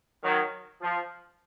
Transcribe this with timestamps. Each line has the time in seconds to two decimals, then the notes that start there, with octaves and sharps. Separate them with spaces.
0.23 D#3 F#3
0.82 F3